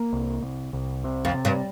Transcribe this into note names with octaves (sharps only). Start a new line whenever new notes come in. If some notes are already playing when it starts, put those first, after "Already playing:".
Already playing: A#3
C2
C2
C2
C3
F2
C3
G2